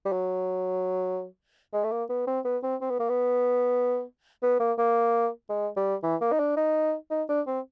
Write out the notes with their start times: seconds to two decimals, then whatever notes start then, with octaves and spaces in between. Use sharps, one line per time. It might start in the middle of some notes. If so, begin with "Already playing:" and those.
0.05 G3
0.12 F#3
1.73 G#3
1.84 A3
1.92 A#3
2.10 B3
2.27 C4
2.45 B3
2.63 C4
2.81 C4
2.90 B3
2.99 A#3
3.09 B3
4.43 B3
4.60 A#3
4.78 A#3
5.49 G#3
5.77 G3
6.03 E3
6.21 A#3
6.32 D#4
6.39 D4
6.57 D#4
7.11 D#4
7.29 D4
7.47 C4